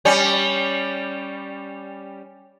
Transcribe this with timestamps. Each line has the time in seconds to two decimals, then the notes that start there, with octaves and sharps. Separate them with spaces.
0.05 G3 C#4